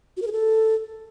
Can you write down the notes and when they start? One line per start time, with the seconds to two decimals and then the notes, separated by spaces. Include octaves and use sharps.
0.17 F#4
0.22 A#4
0.27 G#4
0.32 A4